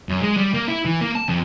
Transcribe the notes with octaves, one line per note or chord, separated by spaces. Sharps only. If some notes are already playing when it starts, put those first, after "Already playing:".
F#2
G#3
G3
A#3
E4
E3
A#3
A5
F2